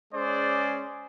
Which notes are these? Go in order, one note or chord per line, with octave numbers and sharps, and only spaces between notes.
G#3 C#4 G#4 C5 D5